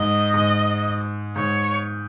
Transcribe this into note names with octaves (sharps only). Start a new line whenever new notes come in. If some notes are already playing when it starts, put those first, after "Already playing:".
Already playing: G#2 D#5
G#2
G#2 C#5